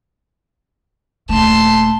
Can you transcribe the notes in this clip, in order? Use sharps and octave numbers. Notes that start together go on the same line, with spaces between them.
D#1 A3 A5 C6